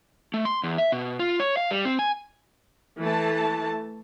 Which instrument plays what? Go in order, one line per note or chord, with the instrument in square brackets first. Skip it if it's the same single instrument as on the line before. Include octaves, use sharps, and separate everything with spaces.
[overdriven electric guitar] A3
C6
E2
E5
B2
F4
C#5
F5
G3
C4
G#5
[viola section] E3 A3 A5